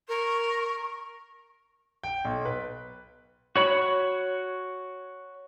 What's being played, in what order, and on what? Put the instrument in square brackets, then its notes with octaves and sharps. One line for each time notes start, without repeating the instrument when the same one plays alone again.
[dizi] A#4 [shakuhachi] C#6
[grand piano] G5
B1
B4
[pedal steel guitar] F#4 C#5 B5